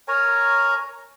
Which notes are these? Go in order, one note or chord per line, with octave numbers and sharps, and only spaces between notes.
A#4 C#5 G#5 A#5